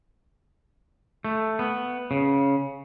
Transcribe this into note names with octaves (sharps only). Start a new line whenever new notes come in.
A3
B3
C#3